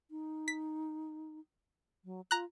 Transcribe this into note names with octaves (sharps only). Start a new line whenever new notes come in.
D#4
B6
F#3
F4 A#5 F#6